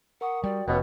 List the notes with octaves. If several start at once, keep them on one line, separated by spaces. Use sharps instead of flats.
A#4 F#5 C#6 D#6
G3 F#4 D5 G5
F1 C#2 B2 F#5